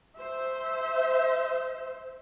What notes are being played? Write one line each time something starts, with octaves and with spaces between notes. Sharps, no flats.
C5 E5